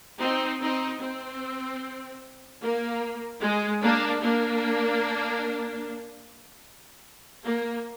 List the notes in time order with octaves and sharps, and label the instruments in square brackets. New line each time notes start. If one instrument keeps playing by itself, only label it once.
[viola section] C4 D#4
C4 D#4
C4
A#3
G#3
A#3 D4
A#3 D4
A#3